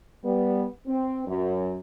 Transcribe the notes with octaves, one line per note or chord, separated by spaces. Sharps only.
G3 B3
C4
F#2